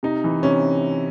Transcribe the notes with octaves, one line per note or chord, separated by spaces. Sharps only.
C3 D#4
E3
C3 C#4